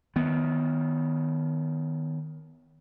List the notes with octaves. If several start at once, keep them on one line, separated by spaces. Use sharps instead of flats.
D#3 B3